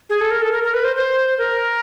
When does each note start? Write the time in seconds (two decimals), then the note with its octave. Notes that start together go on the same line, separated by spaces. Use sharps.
0.10 G#4
0.21 A4
0.31 A#4
0.42 A4
0.52 A#4
0.64 A#4
0.74 B4
0.84 C5
0.96 C5
1.38 A#4